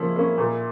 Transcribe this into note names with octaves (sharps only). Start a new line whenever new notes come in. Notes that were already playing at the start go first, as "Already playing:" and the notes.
Already playing: F3 A#3 C#4 E4
A#3 C#4
A#2